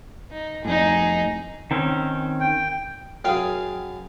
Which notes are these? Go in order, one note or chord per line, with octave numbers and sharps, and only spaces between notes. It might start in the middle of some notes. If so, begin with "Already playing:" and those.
D#4
F2 A2 D#4 G#4
D#3 C4 C#4
G5
F#2 G#4 F5 G5 G#5